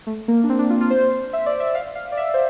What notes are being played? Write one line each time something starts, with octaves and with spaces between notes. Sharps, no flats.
A3
A#3
D4
C4
D4
F4
F4
C5
E5
D5
E5
F5
F5
D5
E5
C5